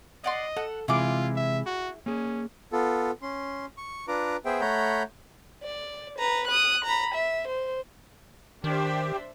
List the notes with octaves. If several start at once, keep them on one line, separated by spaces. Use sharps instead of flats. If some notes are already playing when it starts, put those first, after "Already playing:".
D5 D#5 F#5 C6
A4 F#5
C3 E3 G#3 E4 F4 G#4 D6
E5
F#4
A#3 C#4 G#4
B3 F4 A4
C#4 C6
C#6
D4 F4 B4 A#5 D6
B3 G#4 C5 E5 G5
A3 C#5 F#5 A#5 B5 G6
D5
B4 A#5
D#6 F#6
A#5 B5
E5
C5
D#3 D4 G4 C5 E5